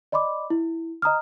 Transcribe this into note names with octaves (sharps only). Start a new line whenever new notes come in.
D5 D#5 B5 C6 D6
E4
D#5 A#5 D#6 F6